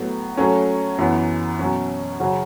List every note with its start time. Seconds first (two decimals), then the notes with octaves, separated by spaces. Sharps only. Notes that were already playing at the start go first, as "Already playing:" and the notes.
Already playing: A2 F#3 B3
0.37 F#3 A3 C#4
0.98 F#2 E3 B3
1.59 B2 F#3 C#4
2.20 C#3 F#3 C#4 F#4